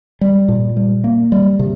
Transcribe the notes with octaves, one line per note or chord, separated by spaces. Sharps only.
G3
A#2
G3
A#3
G3
C3